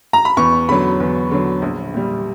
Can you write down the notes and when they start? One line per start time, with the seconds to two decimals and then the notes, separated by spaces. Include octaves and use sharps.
0.13 A#5
0.25 B5
0.37 E2 C#6
0.69 D3 F#3 B5
1.00 E2
1.31 D3 F#3
1.62 A#1
1.94 A#2 G3